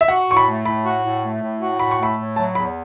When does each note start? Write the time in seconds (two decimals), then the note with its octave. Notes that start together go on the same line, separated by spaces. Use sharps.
0.01 E5
0.08 F#4 F#5
0.28 A2 C#6
0.37 B5
0.46 A3
0.65 A2 B5
0.84 F#4
1.03 A2
1.23 A3
1.41 A2
1.60 F#4
1.79 A2 B5
1.91 C#6
1.98 A3 B5
2.18 A2
2.36 F#3 A5
2.55 E2 B5